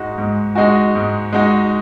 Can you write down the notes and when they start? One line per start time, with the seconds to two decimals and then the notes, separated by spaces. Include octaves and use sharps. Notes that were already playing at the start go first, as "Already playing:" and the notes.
Already playing: G#2 G#3 D#4 F#4
0.18 G#2
0.55 G#3 D#4 F#4
0.95 G#2
1.33 G#3 D#4 F#4